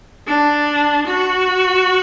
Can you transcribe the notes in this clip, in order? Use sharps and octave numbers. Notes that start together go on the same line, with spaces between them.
D4
F#4